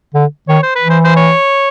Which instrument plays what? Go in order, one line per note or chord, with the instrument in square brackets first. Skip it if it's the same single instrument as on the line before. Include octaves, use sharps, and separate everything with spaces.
[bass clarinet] D3
[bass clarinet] D#3 [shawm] C#5
[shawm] C5
B4
[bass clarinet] E3
[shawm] C5
C5
C#5